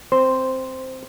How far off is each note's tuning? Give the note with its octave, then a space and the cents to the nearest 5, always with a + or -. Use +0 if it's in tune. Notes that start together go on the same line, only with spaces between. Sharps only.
C4 +5 C5 -5